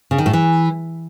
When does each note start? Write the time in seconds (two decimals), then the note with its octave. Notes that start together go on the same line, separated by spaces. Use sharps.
0.11 C#3
0.18 D#3
0.26 A2
0.33 E3